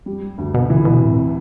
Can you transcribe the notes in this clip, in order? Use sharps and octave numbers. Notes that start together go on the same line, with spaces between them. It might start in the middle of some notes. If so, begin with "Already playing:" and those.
G3
D2
B2
C3
D3 E3
B2
A2 C3